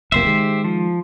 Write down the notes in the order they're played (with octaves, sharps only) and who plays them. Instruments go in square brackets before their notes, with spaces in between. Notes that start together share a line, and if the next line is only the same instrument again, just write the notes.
[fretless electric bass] F#1 C2 A#3 [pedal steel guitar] G4 C5 E5
[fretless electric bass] D#3 G#3
[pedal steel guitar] F3